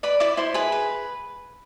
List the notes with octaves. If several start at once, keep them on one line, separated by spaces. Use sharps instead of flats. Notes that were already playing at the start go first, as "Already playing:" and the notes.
B4 D5 B5
E4 D5 D6
E4 C5 C6
G#4 B4 B5
B4